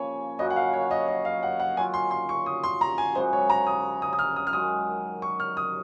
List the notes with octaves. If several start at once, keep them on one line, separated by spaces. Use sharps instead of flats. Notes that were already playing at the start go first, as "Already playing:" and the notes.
Already playing: C#3 F3 A#3 C#5 G#5
F#2 C#3 F#3 D#5
F#5
F5
C#5
D#5
D#5
F5
F#5
F#5
D#3 F#3 C#4 F4 G#5
C6
C6
C#6
D#6
C6
A#5
G#5
F#2 C#3 G#3 D#4 C5
C#5
A#5
D#6
D#6
D#6
F6
D#6
F6
F#2 D#3 G#3 D#6
C#6
F6
D#6